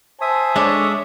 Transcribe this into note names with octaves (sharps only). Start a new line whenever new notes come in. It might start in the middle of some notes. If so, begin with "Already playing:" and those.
C5 E5 G#5 A5 D#6
G#3 D4 A4 C#5 D6